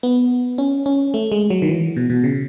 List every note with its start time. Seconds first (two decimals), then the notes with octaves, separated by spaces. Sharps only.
0.03 B3
0.58 C#4
0.86 C#4
1.14 A3
1.32 G#3
1.50 F#3
1.62 D#3
1.69 E3
1.97 B2
2.10 B2
2.24 C#3